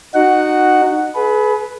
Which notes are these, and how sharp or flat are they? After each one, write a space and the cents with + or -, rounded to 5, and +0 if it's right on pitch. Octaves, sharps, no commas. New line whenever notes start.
D#4 -25 F#4 +0 F#5 +5
G#4 +40 B4 +0